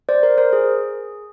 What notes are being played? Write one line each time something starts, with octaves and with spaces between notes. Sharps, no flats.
C5 D5
A#4 C5
A#4 C5
G#4